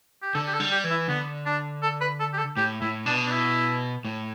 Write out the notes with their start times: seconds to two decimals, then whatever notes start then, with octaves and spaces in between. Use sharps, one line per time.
0.23 G4
0.35 D3 A4
0.47 G4
0.53 A4
0.60 G3
0.72 G4
0.84 E3
0.90 E4
1.09 D3 B3
1.46 D4
1.83 A4
2.01 B4
2.20 A4
2.34 G4
2.38 A4
2.57 A2 G4
2.81 A2 E4
3.06 B2 D4
3.26 D4
3.31 E4
4.05 A2